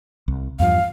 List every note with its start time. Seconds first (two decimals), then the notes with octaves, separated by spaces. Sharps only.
0.28 C2
0.60 E2 G2 F3 F5